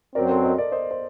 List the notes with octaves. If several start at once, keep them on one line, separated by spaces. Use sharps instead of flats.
F#2 F#3 C4 A#4 D5
A4 C5
C5 D#5
A#4 D5
C5 D#5
C5